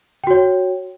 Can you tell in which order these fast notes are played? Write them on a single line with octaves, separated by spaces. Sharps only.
G5 F#4 C#5